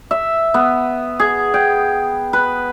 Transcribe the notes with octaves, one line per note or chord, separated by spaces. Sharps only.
E5
B3
G#4
G5
B4